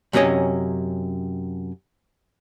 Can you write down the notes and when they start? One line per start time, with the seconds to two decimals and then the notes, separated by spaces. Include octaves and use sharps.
0.13 F#2 C3 C#4 D#5 G#5